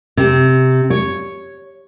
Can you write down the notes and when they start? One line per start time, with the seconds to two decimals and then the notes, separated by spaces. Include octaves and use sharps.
0.17 C3
0.90 C#5